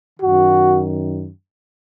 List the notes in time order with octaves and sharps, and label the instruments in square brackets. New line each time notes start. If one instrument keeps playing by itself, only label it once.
[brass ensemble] F#2 D#3 F#4